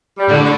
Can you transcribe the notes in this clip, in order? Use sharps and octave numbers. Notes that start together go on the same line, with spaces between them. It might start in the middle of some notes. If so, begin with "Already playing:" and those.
G3
A2 D3
D3